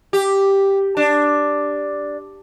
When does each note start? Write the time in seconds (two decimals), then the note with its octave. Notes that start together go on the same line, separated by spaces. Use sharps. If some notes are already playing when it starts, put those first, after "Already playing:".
0.13 G4
0.97 D4